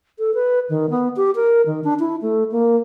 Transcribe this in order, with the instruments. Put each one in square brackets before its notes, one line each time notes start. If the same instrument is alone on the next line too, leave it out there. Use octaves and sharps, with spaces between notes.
[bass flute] A4
B4
D#3
B3
G4
A#4
D#3
D4
E4
A3
A#3